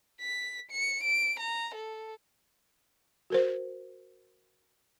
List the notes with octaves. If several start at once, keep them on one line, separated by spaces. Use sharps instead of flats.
B6
C#7
D7
A#5
A4
F#4 A#4 C5